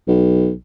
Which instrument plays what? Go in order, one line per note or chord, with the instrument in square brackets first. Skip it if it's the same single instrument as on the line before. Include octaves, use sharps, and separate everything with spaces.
[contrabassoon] B1